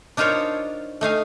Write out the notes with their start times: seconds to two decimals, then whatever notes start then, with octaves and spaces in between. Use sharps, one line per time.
0.17 D4 D#4 F4 A#4 C5 C#5
1.01 A3 D#4 F5 G#5